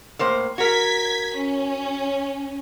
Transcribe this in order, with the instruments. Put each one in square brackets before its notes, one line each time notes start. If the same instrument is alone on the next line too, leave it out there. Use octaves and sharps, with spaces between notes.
[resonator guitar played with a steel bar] A2 A#3 C5
[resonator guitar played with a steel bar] F#4 A#4 [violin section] G#6 B6
[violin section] C#4